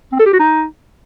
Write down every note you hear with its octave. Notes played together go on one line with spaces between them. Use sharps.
C4
A4
G4
F#4
D#4